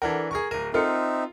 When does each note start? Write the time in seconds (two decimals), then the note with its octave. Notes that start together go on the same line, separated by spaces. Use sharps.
0.02 E3 D4 A4 A#4 F#5
0.31 G#4 A#4 C#6
0.51 D1 A#4 D#7
0.74 C4 D#4 F4 A4 A#4 E5 C#7